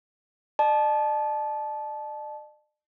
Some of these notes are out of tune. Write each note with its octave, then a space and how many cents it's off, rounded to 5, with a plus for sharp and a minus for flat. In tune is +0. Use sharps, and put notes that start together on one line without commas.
D5 +45 A5 -20